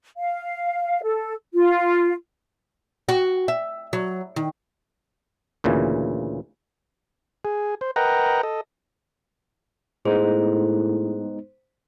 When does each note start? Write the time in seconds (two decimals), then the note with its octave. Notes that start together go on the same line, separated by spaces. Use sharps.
0.17 F5
1.03 A4
1.53 F4
3.09 F#4
3.48 E5
3.93 F#3
4.36 D#3
5.64 D2 A#2 C#3 E3
7.45 G#4
7.81 C5
7.96 A#4 B4 D#5 F#5 G5 A#5
8.43 A4 D#5
10.05 A2 G#3 B3 D#4 G#4 C5